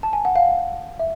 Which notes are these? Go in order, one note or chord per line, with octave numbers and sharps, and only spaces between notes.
A5
G#5
F#5
F5
E5